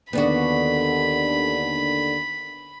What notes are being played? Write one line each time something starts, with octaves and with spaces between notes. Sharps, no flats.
D#2 D3 B3 D4 F#4 B5